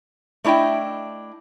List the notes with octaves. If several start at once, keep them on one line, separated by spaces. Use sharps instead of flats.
A3 D4 E4 D#5 G5